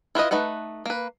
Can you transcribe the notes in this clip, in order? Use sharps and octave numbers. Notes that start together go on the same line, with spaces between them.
E4 F4 B4 D#5
A3 D#4 B4 F#5
A#3 B4